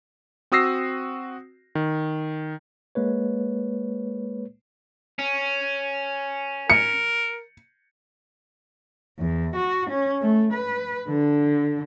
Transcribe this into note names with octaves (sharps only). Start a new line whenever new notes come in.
C4 F#4 D#6 E6 A#6 C7
D#3
G#3 A#3 B4 C#5
C#4
A#4 C#7
E2
F#4
C#4
A3
B4
D3